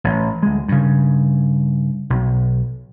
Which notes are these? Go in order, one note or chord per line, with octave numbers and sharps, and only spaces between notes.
A1
D2 G#3
G2 C#3
B1